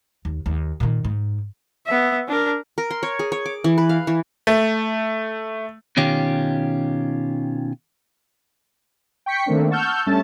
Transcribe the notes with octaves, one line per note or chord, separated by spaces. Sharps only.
D#2
D#2
A#2 D#3
G#2
B3 E5
D4 A#4
A#4
C6
C#5
G#4
C#5
D6
E3
B4
F5
E3
A3
B2 D#3 C#4 F4 G4
G5 C#6 B6 C#7
D#3 A3 A#3 C4 D4
F#5 A5 C#6 E6 F6 G6
G2 G3 A3 C#4 E5 A5